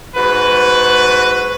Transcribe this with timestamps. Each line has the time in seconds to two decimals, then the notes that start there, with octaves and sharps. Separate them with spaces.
0.15 G#2 F#4 B4